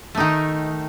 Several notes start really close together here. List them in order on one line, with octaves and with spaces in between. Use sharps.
A3 D#4 D#3